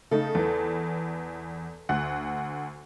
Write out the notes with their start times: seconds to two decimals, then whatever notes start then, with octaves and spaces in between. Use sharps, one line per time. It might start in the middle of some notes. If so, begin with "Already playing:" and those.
0.11 C#3 A3 D#4 A4
0.35 E2 E3
1.89 D2 F#5 F#6